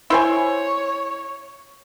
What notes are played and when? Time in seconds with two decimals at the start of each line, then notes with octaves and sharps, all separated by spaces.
0.10 E4 C5 C#5 G#5